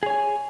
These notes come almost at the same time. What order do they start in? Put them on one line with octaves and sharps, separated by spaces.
G#4 C#5 G#5